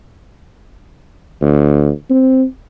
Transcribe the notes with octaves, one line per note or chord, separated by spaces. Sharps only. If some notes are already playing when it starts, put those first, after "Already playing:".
D2
C4